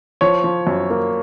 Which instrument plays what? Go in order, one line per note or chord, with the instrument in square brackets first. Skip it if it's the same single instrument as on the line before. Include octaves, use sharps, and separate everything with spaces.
[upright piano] F3 C#5
F3
F#2
A#3